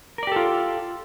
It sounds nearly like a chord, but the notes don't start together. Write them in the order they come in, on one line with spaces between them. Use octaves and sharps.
A#4 D5 G4 A4 F4